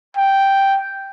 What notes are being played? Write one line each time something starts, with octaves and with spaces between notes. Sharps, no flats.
G5